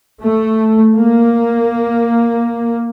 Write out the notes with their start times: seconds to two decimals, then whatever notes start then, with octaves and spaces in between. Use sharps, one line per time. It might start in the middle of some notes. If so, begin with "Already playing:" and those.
0.23 A3
0.96 A#3